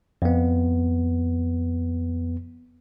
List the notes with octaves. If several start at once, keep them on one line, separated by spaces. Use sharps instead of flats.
F2 B3